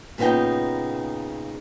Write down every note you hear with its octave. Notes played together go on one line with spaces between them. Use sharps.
A#2 C#3 B3 D#4 G5